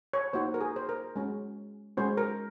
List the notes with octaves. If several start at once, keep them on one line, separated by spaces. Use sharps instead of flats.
C#5
A#3 D#4 F#4 C5
A#4
G#4
C5
A#4
G#3 C#4 F#4
G#3 C#4 F#4 C5
A#4